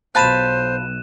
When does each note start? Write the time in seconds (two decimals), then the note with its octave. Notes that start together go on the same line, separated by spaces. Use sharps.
0.15 B1 F4 C5 A5 B5 F#6 D#7 E7